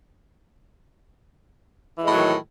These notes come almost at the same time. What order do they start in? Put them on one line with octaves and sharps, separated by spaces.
E3 G#3 A2 F#3 D#3